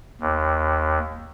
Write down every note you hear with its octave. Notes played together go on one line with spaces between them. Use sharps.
D#2